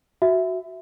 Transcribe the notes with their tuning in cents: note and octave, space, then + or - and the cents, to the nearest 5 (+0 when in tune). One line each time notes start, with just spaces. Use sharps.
F#4 +0 E5 +0